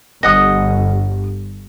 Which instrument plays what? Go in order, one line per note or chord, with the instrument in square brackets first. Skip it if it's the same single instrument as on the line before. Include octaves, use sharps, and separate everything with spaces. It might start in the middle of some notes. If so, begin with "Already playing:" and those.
[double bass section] G1 [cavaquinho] D#5 F#5 D#6